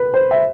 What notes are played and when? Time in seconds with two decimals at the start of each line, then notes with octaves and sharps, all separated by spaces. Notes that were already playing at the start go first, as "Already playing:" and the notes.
Already playing: B4
0.14 C5
0.31 E5